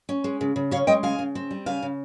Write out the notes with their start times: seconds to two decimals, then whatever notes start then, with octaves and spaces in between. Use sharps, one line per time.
0.09 C#4
0.24 G#3
0.41 C#3
0.56 C#3
0.71 C#4 C#5 F5
0.87 G#3 D#5 G5
1.03 C#3 F5 G#5
1.19 C#3
1.35 C4
1.51 G3
1.66 C#3 F5 G#5
1.82 C#3